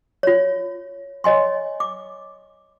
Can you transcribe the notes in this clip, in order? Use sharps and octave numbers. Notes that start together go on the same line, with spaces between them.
F4 C#5
C#5 D#5 G#5 C6
D6